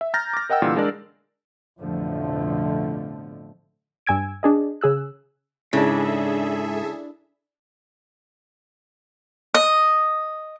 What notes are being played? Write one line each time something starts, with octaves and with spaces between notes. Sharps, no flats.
E5
A#5 F6 G6 A6 A#6
D6 A#6
A#4 D#5 F#5 G5 E6
A#2 D3 E3 G3
G#3 D4 A#4 D5
A1 F2 B2 D3 F3 A3
G2 G#5 E6 G#6 D7
D4 G#4 D#5
C#3 G#4 E6 F#6
G#2 C#3 D4 E4 G#4 A4 E5
D#5